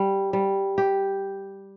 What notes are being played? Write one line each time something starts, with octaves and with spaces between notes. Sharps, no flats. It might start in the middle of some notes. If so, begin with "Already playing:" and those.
Already playing: G3
G3
G4